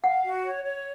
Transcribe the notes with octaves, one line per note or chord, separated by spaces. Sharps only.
F5 F#5
F#4
C#5
C#5